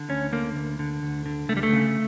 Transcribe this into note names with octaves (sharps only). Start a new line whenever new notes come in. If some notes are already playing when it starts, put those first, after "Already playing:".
Already playing: D3
D2 C#4
D3 A#3
D2
D3
D2
D3
C#2 A3
G3
A3
C#3